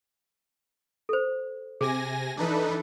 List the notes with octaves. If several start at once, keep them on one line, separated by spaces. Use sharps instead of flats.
A4 C5
C3 G#4 G#5 A#6
E3 D4 D#4 A4 B4